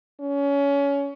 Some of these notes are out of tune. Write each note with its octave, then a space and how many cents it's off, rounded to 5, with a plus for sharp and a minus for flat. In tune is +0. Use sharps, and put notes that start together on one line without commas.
C#4 +25